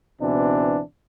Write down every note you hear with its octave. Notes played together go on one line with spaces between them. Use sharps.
C#2 B2 E3 C4 D4